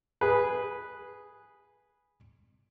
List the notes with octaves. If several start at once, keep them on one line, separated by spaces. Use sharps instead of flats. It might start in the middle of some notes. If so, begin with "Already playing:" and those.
G#4 B4